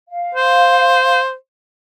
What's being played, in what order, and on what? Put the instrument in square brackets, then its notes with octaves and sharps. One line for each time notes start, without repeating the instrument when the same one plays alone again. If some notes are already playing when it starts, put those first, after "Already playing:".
[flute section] F5
[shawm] C5